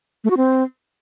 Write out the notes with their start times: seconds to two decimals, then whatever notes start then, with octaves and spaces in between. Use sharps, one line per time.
0.24 A3
0.31 F#4
0.37 C4